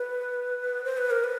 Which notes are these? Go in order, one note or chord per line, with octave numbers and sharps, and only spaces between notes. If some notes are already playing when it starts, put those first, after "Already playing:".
Already playing: B4
C5
B4
A#4
B4